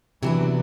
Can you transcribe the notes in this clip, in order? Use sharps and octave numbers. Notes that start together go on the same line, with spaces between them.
C3 E3 F#3 B3 D4